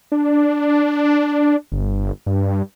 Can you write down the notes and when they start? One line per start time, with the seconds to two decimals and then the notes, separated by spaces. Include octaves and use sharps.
0.12 D4
1.72 G1
2.27 G2